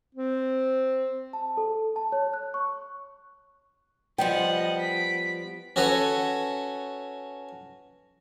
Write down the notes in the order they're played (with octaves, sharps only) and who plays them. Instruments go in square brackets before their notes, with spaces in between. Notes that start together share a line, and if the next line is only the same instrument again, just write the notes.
[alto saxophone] C4
[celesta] A5
A4
A5
C#5
F#6
C#6
[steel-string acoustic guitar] F3 G3 B3 [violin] D#5 F#5 [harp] G5
[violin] B6 D7
[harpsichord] C#4 F#4 A4 B4 C#5